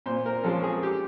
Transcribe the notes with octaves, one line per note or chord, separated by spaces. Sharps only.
A#2 C5
A#4
F3 G#3 C#4 A4
G#4
G4